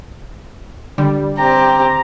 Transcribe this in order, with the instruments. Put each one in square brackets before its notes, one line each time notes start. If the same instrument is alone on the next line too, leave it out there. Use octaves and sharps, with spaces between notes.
[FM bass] D3 [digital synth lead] G3
[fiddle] C4 G4 [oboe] A#5